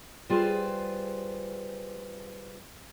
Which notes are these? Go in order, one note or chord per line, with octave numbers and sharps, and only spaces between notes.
G3 F4 G#4 B4 C5